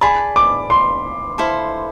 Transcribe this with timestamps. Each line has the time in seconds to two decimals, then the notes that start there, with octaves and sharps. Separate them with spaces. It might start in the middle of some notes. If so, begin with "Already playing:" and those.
0.01 G#4 D5 A5 B5
0.36 D6
0.70 C6
1.38 E4 A4 C5 F5